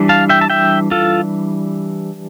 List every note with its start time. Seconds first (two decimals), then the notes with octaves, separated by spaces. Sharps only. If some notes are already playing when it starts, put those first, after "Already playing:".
Already playing: E3 G3 D4
0.09 F5 A5
0.29 E5 G5
0.41 A5
0.50 E5 G5
0.91 F4 A4